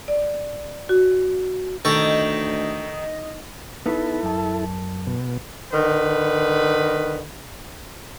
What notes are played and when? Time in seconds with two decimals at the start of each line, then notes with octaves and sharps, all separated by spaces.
0.08 D5
0.89 F#4
1.85 D2 D#3 A4 D#5 G5 C#6
3.86 B3 D#4 E4 A4 B4
4.23 F#2 A5
5.07 B2
5.73 D3 D#3 B4